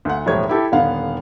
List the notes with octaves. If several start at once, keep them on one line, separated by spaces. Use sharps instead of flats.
D2 F#5
E1 A2 F3 G3 C#5 G#6
E4 G4 A4
D#1 D3 B3 F5 F#5